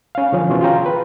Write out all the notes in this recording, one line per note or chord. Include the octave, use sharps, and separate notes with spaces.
C#4 F5
D3 F3 C#4
B2 E3 B3 C#4 F4 F#4
F4 G#4 G5 A#5
B4